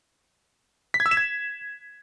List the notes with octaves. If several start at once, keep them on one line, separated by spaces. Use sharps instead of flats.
B6
G#6
E6
E7
G#6